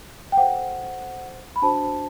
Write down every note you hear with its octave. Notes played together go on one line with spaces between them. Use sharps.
G5
F#4 A4 C5 F#5
B5
D4 F#4 C5 A5